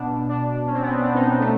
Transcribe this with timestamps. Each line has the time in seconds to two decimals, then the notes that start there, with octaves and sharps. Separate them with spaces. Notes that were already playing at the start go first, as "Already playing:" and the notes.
Already playing: B2 D4
0.29 D4
0.66 C#4
0.73 C4
0.82 B3
0.89 C4
1.02 D4
1.14 D#4
1.28 D4
1.40 B2 A3